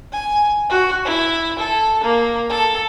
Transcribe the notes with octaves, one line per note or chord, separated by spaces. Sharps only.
G#5
F#4
E4
A4
A#3
A4